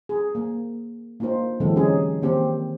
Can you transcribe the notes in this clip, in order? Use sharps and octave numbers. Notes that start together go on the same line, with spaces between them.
G#4
A#3
A#3 D4 D#4 F4 C5
D3 E3 F#3 G#3 C4 A4
D3 C4 C#4 D#4 G4 G#4
D#3 A#3 C4 G4 C5